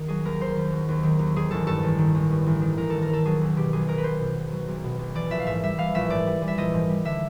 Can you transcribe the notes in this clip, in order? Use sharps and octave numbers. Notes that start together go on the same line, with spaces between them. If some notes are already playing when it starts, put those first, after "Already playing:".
Already playing: D#3
F#3 G#4
D#2 A#4
D#3 C5
D#2
F#3
D#2
D#3
D#2
D#3 G#4
A1 A4
G2 A4
A1
D#3
A1
G2
A1
D#3
A1 A#4
G2 A4
A#4
A1 A4
F#3 G#4
B1
B2 G4
B1 G#4
F#3 A#4
B4
B1 C5
B2
B1
F#3
B1
B2
B1
E3 D5
A#1 E5
F5
G#2 E5
G3 E5
E3 F5
A#1 E5
G#2 D5
G3
E3
E5
A#1 D#5
G#2
G3
D3 E5